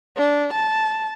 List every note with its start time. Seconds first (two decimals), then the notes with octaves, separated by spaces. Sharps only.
0.17 D4
0.53 A5